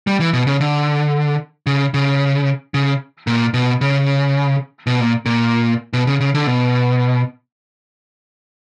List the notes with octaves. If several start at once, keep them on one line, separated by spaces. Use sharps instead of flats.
G3
E3
B2
C#3
D3
C#3
C#3
C#3
A#2
B2
C#3
B2
A#2
A#2
B2
C#3
C#3
D3
B2